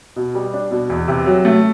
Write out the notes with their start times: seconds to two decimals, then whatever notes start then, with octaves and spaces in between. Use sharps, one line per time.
0.16 B2
0.35 G3
0.54 D4
0.71 B2
0.90 E2
1.08 C3
1.26 F#3
1.45 A3